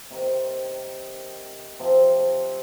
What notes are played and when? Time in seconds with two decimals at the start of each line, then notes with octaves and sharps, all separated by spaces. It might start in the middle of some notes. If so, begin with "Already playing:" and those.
0.11 C3 D#3 C4
1.79 C3 F3 C4